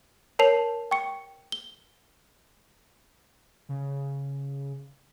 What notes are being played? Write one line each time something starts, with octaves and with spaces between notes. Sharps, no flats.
A#4 C#5 A5 C7 F7
G5 C#6 C#7
G7
C#3